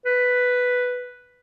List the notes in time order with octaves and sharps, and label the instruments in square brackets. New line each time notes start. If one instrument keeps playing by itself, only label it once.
[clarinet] B4